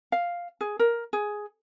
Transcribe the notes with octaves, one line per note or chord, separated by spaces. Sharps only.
F5
G#4
A#4
G#4